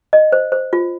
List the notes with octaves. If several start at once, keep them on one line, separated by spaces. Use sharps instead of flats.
D#5
C5
C5
F4